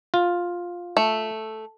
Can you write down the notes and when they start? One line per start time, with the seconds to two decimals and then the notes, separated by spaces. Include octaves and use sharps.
0.14 F4
0.97 A3